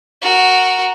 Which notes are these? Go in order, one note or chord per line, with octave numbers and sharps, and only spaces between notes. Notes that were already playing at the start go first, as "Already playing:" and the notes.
F#4 A#4